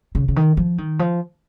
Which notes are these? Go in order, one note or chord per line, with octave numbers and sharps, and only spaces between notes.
C#3
C#3
D#3
F3
D#3
F3